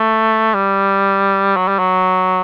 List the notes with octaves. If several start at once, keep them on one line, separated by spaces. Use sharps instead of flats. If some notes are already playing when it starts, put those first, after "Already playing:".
Already playing: A3
G3
F#3
G3
F#3